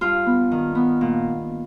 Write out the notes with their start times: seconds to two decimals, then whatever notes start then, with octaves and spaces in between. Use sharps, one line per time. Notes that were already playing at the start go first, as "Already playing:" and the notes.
0.01 G2 F4
0.26 B3
0.51 D#3
0.75 B3
1.01 A#2